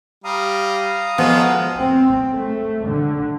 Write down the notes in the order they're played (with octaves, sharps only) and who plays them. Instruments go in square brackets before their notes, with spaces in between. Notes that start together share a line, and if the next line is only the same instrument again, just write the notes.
[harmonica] G3 [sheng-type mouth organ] F5 A#5 D#6
[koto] F3 [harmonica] G#3 F#4 A4 [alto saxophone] B3
[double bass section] C4
A3
D3